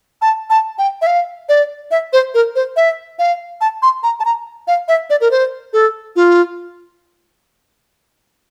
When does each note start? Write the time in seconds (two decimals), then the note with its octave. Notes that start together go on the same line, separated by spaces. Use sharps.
0.22 A5
0.50 A5
0.78 G5
1.02 E5
1.07 F5
1.49 D5
1.91 E5
2.13 C5
2.34 A#4
2.56 C5
2.76 E5
3.19 F5
3.61 A5
3.82 C6
4.03 A#5
4.20 A5
4.25 A#5
4.67 F5
4.88 E5
5.10 D5
5.21 A#4
5.31 C5
5.73 A4
6.16 F4